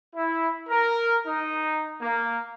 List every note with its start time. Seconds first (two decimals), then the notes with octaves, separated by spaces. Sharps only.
0.15 E4
0.69 A#4
1.26 D#4
2.01 A#3